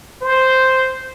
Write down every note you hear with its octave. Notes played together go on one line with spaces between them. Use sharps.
C5